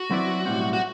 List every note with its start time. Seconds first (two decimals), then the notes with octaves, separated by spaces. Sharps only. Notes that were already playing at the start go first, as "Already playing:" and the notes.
Already playing: F#4
0.11 F#3 C4 E4 B4 D5
0.45 B1 A2 G3 C4
0.73 F#4